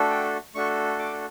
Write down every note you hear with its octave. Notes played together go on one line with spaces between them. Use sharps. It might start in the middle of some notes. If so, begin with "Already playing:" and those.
Already playing: A3 D4 F#4 A4
G5
A3 D4 F#4 A4 C#6
D6